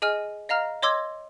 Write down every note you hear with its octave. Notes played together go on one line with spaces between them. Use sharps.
G#4 D#5 G#5 F6
D#5 F5 A#5 F6
C#5 D#5 C6 D6 E6 G#6